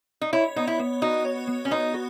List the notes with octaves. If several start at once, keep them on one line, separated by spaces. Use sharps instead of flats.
D#4
E4 C#5
B3 D#4
E4
B3
D#4 F#4
C#5
B3
C#4
B3 D#4
F#4